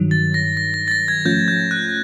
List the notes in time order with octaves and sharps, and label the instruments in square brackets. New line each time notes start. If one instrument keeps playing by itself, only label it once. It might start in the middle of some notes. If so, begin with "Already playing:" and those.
Already playing: [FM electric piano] G2 D#3 F#3
[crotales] A6
A#6
A#6
A#6
A6
A#6
G#6
[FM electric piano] G#2 F3 A3 C#4 F4 [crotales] G6
[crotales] G6
F#6